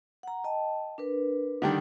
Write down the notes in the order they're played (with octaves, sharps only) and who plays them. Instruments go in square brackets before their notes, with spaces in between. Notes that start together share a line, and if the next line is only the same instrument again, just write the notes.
[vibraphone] F#5 A#5
D#5 G5 A5
D4 A#4 B4
[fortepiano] D3 D#3 G3 [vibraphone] D#4